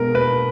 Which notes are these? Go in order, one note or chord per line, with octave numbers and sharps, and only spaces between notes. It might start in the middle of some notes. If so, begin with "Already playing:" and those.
Already playing: B2 G#3 B3 A#4
B4